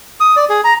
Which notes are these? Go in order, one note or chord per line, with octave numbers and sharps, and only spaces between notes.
D#6
D5
G#4
A#5